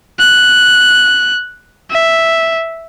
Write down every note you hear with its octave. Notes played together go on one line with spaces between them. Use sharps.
F#6
E5